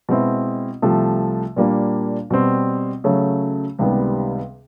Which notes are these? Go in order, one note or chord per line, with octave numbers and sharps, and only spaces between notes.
B2 G#3 C4 E4
C2 C3 F3 A3
A#2 G3 A#3 D4
B2 G3 C4
C#3 F#3 A3 C#4
C#2 C3 D#3 G3 B3